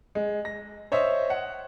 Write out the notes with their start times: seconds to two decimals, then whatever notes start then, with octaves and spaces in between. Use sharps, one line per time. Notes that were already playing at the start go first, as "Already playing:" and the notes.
0.15 G#3
0.45 A#6
0.92 C5 C#5 D#5 E5
1.30 F#5